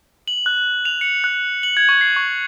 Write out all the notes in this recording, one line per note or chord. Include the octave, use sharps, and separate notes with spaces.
F#7
F#6
F7
C#7
F#6
F#7
G#6
C#6
C7
C#6